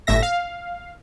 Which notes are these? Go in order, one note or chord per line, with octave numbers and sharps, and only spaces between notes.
G1 A2 E5 A#6
F5